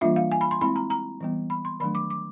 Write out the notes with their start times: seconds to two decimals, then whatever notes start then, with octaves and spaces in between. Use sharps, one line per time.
0.01 E3 G3 A#3 D4 F4 E5
0.16 F5
0.31 G#5
0.41 B5
0.51 C6
0.61 G#3 C4 E4 B5
0.76 A#5
0.90 A#5
1.21 E3 G3 B3
1.50 B5
1.65 C6
1.80 D#3 F#3 A3 D4 B5
1.95 D6
2.10 D6